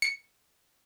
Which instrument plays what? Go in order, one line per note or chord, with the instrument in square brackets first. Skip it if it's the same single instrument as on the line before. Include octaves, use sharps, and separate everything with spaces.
[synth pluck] C#7